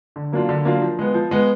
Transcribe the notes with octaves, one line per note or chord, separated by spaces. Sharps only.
D3
F#3 A#3 D4 F4
D3
F#3 A#3 D4 F4
F3
G#3 B3
F3
G#3 B3